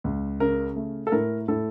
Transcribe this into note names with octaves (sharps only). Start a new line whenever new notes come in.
C#2
C#3 A#4
A3
A4
A2 A#4
A2 A4